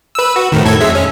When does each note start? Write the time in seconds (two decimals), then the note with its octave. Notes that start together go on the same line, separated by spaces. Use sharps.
0.15 B4 E6
0.36 F#4
0.52 F2 A2 D#3
0.65 A2 A4 G#6
0.81 F2 G#3 E5
0.95 C#4